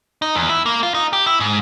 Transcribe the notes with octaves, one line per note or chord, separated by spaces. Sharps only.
D#4
E2
E4
A#3
F4
D#4
G4
E4
G#2